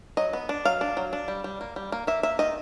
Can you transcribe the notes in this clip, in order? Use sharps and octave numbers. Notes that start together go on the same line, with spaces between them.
F#3 D#5
B3
D4
F#3 F5
D4
F#3
D4
G3
G3
A#3
G3
A#3
A#3 E5
A#3 E5
D#3 D#5